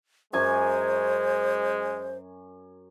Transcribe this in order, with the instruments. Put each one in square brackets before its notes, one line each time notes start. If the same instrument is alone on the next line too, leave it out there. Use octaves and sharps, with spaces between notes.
[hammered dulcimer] F#2 G#5 C#6 [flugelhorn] G#3 [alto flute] C5